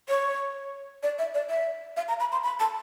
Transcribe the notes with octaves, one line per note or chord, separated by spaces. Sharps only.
C#5
D5
E5
D5
E5
F5
A#5
B5
C6
B5
A5